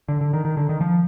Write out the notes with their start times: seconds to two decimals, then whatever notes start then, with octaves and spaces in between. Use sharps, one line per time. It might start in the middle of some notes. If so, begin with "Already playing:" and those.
0.08 D3
0.21 D3
0.33 D#3
0.45 D#3
0.57 D3
0.69 D#3
0.81 F3